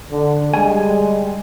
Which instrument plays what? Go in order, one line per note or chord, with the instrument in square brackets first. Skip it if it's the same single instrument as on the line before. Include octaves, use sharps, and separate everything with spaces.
[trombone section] D3
[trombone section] G3 [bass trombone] G#3 [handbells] G#5